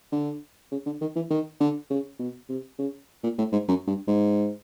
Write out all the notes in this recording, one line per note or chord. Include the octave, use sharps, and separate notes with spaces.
D3
C#3
D3
D#3
E3
D#3
D3
C#3
B2
C3
C#3
A#2
A2
G#2
F#2
G2
G#2